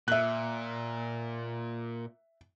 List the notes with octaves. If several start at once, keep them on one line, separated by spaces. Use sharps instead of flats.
A#2 E5 F#6